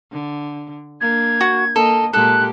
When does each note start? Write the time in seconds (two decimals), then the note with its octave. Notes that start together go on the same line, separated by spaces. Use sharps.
0.12 D3
1.01 A#3 D4 G#6
1.41 F#4
1.76 A#3 A4 D#5
2.13 A#2 G#3 G4 A4 F#6